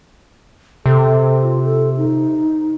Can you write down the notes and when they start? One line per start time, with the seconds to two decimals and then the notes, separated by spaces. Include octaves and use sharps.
0.86 C3 A4
1.43 F4
1.64 A4
1.97 D#4